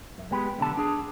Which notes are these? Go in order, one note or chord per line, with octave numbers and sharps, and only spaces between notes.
F#2
G#3 B3 G4 B4
B1 D3 B3 A5
D4 G#4